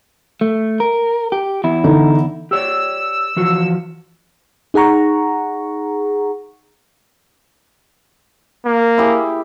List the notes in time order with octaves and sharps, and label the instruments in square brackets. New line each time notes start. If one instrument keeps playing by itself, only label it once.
[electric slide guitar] A3
A#4
G4
E2 E4
[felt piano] D3 D#4 A4
[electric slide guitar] G4 C#5 D5 [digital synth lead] E6
[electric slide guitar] E3 F3 F#4
[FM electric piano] D#4 G#4 F#5 A#5 C#6
[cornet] A#3
[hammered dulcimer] E4 G4 G#4